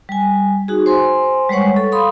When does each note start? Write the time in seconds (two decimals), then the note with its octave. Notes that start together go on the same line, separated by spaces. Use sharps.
0.09 G3 G#5
0.68 D#4 F#4 G#4
0.86 C5 G#5 C6
1.49 G3 G#3 B4 C#5 F#5 C#6
1.76 A4
1.92 F5 B5 C6 D#6